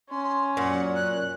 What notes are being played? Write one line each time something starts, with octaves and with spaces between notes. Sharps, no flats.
C#4 C6
F#2 A#2 F#5
F#6